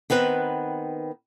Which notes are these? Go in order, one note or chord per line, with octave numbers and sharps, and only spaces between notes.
D#3 B3 C4 B4